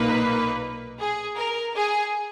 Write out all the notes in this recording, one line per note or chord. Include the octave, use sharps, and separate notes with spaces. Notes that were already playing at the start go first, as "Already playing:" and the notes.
Already playing: B1 A#2 A#3 D#4 B4
G#4
A#4
G#4